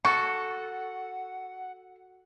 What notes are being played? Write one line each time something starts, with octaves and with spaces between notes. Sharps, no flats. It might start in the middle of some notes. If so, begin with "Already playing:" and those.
F#4 A4 F#5 C#6